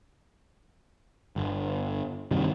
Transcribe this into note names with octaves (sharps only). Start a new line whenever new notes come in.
G1
G2 C3 D#3 G3